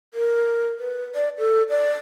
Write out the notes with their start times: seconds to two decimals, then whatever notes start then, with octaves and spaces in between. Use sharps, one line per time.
0.14 A#4
0.79 B4
1.15 D5
1.39 A4
1.69 D5